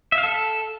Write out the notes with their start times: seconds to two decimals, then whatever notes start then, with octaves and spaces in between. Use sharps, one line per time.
0.12 E5
0.18 F5
0.23 A4